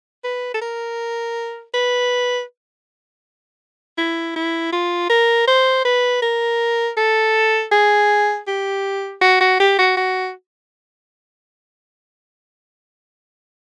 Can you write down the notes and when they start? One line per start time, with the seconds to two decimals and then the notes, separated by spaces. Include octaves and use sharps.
0.24 B4
0.54 A4
0.61 A#4
1.74 B4
3.97 E4
4.36 E4
4.72 F4
5.09 A#4
5.47 C5
5.85 B4
6.22 A#4
6.97 A4
7.71 G#4
8.47 G4
9.21 F#4
9.40 F#4
9.60 G4
9.78 F#4
9.97 F#4